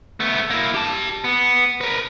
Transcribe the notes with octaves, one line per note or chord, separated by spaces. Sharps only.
A3 B3
A#3 E4
G4 A5
B3
A#4 B4